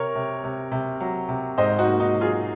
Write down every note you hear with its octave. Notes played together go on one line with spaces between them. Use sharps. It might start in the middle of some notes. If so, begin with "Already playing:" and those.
Already playing: C3 A#4 C#5
C3
C3
C3
F#3
C3
G#2 C5 D#5
D#4 F#4
A#3
D#4 F#4
F#3
F4 G#4